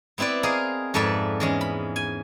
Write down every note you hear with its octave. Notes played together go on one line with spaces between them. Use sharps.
B3 C4 E4 B4 D5
G#4 A#4 D#5 F5
F2 G#2 A4 B4 D5 E5
E2 G#3 C#4
B5
G#5